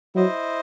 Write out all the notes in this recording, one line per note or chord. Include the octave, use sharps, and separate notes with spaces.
F#3 E4 C5 D#5